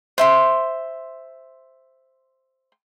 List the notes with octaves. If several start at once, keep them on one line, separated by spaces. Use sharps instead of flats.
C5 E5 C6